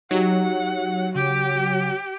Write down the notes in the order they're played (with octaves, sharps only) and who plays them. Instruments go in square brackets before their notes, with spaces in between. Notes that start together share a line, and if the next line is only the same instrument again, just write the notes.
[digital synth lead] F#3 [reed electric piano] D#4 G4 [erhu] F#5
[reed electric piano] C#3 [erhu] G4